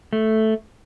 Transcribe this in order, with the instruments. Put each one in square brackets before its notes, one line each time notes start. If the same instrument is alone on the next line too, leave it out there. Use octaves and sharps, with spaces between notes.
[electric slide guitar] A3